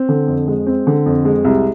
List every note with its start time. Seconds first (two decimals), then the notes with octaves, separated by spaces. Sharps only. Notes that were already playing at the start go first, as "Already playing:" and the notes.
Already playing: C4
0.09 D3
0.28 F2
0.48 G#3
0.67 C4
0.87 D3
1.06 F2
1.25 G#3
1.45 C2